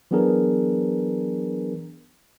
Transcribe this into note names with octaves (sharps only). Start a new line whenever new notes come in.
E3 F#3 B3 D4 G#4 A#4